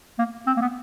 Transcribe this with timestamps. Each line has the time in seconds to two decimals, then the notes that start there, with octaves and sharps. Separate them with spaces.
0.19 A#3
0.47 C4
0.57 A#3
0.62 B3